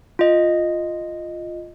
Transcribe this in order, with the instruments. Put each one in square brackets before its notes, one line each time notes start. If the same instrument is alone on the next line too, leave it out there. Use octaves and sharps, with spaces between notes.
[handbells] F4 D#5